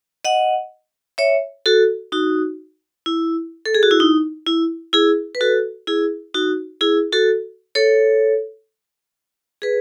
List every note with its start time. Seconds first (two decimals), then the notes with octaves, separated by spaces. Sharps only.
0.25 D#5 F#5
1.18 C#5 E5
1.66 F#4 A4
2.12 D#4 F#4
3.06 E4
3.65 A4
3.75 G#4
3.83 F#4
3.91 E4
4.00 D#4
4.46 E4
4.93 E4 G#4
5.35 B4
5.41 F#4 A4
5.87 E4 G#4
6.34 D#4 F#4
6.81 E4 G#4
7.13 F#4 A4
7.75 A4 C#5
9.62 G#4 B4